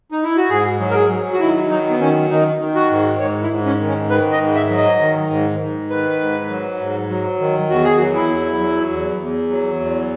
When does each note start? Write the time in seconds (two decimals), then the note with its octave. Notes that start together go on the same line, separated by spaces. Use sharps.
0.12 D#4
0.24 E4
0.37 F#4
0.50 G#2 G#4
0.80 F#3
0.91 A#4
0.95 G#4
1.10 F#3
1.34 F#4
1.39 D#3 E4
1.70 F#3 D#4
1.90 B3
2.00 D#3 C#4
2.30 D#3 D#4
2.60 D#3
2.75 F#4
2.90 G#2
3.20 G#2 C#5
3.43 E4
3.50 G#2
3.66 C#4
3.80 D#3
3.87 C#4
4.10 D#3 B4
4.32 D#5
4.40 G#2
4.55 E5
4.70 F#3
4.77 D#5
5.00 D#3
5.30 G#2
5.59 G#2
5.90 D#3 B4
6.20 G#2
6.50 F#3
6.80 G#2
7.10 F#3
7.40 D#3
7.70 E2 F#4
7.84 G#4
7.97 F#3 F#4
8.15 E4
8.30 E2
8.60 F#3
8.90 E2
9.21 E2
9.50 F#3
9.80 E2